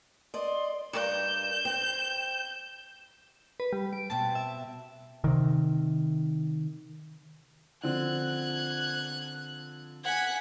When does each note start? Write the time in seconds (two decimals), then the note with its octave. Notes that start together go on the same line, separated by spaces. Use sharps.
0.34 D5 D#5 C6
0.93 G2 A#4 D5 G6 E7
1.65 C4
3.60 B4
3.73 G3
3.93 D7
4.10 B2 C4 A5
4.35 E5
5.24 C3 D#3
7.83 D3 F3 C4 F#6 G#6
10.05 F#5 G#5 G#6 B6